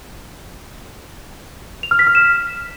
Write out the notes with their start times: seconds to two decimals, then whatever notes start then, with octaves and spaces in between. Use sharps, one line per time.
1.83 F7
1.91 F6
1.99 B6
2.07 F6
2.15 E7